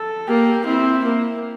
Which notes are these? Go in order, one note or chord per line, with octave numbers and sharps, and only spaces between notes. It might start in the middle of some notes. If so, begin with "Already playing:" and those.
Already playing: A4
A#3 G4
C4 E4
A#3